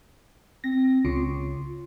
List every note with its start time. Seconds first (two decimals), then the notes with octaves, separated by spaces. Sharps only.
0.64 C4 A#6
1.05 C#2 C#3 F4